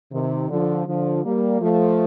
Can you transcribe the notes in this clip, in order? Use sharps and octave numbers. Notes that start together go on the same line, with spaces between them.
C3 D#3
D3 F3
D3 F3
G3 A#3
F3 A3